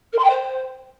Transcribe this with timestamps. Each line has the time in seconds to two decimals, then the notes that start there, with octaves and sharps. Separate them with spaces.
0.13 A#4
0.18 C6
0.24 G5
0.29 C5